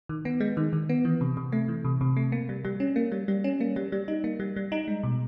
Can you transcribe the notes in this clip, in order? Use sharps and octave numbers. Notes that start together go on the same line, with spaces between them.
D#3
B3
G#3
D#3
D#3
B3
E3
C3
C3
A3
E3
C3
C3
A3
A#3
G3
G3
C#4
A#3
G3
G3
C#4
A#3
G3
G3
D#4
A#3
G3
G3
D#4
G#3
B2